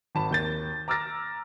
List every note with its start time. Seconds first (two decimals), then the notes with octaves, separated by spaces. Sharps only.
0.15 G#1 A5 B5
0.31 D#2 G6 A6
0.88 A#5 D6 E6 F6 A6 A#6